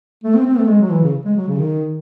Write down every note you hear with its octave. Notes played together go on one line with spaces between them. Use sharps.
A3
C4
C4
A3
G#3
F#3
E3
C#3
G#3
F#3
C#3
D#3